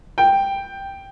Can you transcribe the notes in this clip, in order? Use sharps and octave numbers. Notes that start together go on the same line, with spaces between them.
G5